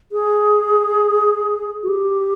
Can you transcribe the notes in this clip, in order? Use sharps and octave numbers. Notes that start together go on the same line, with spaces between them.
G#4
F#4
G4